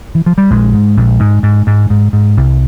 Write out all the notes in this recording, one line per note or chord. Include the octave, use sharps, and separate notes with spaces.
E3
F3
G3
A#1 G#3
G#2
A#1
G#2
G#2
G#2
G#2
G#2
C2